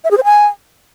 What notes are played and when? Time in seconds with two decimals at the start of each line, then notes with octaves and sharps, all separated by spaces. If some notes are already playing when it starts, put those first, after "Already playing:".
0.04 E5
0.11 G#4
0.18 C5
0.24 G#5